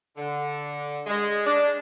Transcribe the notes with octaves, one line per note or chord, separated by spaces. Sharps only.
D3
G#3
D4